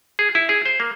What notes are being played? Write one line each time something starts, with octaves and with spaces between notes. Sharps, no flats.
G#4
E4
G#4
C5
A#3